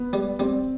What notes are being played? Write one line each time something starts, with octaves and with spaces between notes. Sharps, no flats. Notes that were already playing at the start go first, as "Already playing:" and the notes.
Already playing: B3
G3
G3 C4